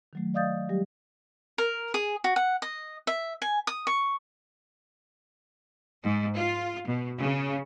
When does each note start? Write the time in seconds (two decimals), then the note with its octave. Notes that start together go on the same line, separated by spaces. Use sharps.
0.13 D#3 F#3 A3
0.34 D5 D#5 F5 D#6 G6 A6
0.69 F#3 G3 G4
1.58 A#4
1.94 G#4
2.24 F#4
2.36 F#5
2.62 D#5
3.07 E5
3.42 G#5
3.67 D#6
3.87 C#6
6.03 G#2
6.35 F4
6.87 B2
7.20 C#3